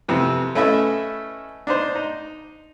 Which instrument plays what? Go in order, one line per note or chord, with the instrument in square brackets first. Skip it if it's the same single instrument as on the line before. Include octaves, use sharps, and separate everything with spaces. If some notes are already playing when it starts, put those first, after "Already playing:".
[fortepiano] F2 C3 E3
A3 C#4 E4 B4 D#5 E5
D4 D#4 C5
D#4